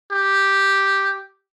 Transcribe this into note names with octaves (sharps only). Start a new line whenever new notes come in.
G4